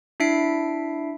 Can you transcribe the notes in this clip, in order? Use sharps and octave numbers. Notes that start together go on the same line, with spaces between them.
D4 E4 E5 C7 D7